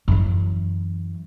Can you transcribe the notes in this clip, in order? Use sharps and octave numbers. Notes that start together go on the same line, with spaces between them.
F#2 E3